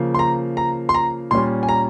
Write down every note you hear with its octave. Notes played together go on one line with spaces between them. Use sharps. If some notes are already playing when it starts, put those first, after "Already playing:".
Already playing: C#3 F3 A#3
C6
A#5
A#5
C6
A#5
A#2 G3 C#4 C6
G#5
A#5